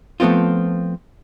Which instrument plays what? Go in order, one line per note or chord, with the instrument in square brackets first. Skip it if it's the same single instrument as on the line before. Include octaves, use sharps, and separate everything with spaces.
[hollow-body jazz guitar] F3 A3 B3 C4 F4